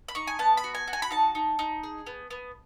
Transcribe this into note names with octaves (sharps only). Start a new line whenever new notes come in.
B5
D#4 C#6
G#5
B3 A5
B5
F#4
G#5
F#4
G#5
B5
D#4 A5
D#4
D#4
G#4
B3
B3